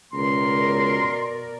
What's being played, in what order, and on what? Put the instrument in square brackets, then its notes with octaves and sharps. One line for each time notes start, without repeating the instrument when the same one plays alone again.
[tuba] C#2 [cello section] B2 A#4 D5 [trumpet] C6